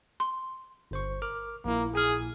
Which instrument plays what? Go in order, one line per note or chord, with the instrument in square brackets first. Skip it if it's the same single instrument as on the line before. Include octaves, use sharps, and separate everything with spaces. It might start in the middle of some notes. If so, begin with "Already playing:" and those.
[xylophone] C6
[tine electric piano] G1 C5 C#6
A#4 D6 F6
[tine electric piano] A#1 A#2 E4 [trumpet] A#3
[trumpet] G#4 [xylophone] G#5 F6